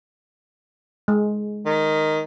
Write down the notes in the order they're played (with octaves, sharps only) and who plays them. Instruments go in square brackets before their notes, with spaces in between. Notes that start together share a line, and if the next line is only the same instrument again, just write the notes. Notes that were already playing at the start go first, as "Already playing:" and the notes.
[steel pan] G#3
[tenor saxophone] D#3